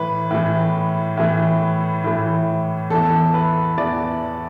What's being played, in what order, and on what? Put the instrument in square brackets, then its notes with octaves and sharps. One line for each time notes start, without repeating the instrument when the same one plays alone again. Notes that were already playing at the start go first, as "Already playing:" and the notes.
Already playing: [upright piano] A2 E3 B4
A2 E3
A2 E3
A2 E3
E2 E3 A4
B4
E2 E3 D5